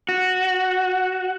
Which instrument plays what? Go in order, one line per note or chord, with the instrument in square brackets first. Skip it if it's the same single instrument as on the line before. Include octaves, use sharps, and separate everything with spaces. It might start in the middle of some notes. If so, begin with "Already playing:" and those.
[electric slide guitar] F#4